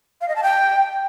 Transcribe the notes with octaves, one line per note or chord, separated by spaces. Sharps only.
F5
D#5
A5
G5